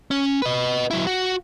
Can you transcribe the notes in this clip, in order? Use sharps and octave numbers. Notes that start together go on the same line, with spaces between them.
C#4
B4 D#5
F#3 E4
F#4